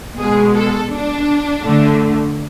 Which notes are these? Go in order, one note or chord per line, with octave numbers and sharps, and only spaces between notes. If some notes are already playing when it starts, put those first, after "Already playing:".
B2 G#3 G#4
A4
D4
D3 A3